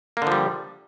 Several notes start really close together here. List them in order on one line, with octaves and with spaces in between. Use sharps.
A#3 D3 F3 G3